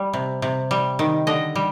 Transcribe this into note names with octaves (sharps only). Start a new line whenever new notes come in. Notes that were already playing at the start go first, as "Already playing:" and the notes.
Already playing: G3
C3
C3
G3
D#3
D3 D#5
G3